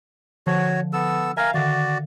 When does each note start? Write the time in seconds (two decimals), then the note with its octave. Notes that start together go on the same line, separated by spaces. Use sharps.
0.47 D3 F3 F#4 C#5
0.93 B3 A4 E6
1.37 A#4 E5 F5 G#5 A#5
1.54 D3 D#3 F#4 D5